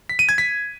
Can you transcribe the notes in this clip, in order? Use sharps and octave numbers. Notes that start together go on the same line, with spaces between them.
B6
D#7
G#6
B6